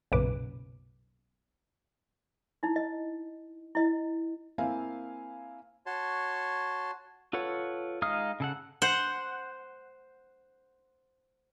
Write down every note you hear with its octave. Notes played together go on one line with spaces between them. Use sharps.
B1 F#2 A#2 C#3 B4 D6
D#4 E4
D#5
E4 D#5
A#3 C4 E4 F5 G#5
F#4 C#5 A5 C6
F4 A4 B4 C#5 F#5
G#3 D#4 F5 D#6 F6
C#3 A4 F#5
C5 F#5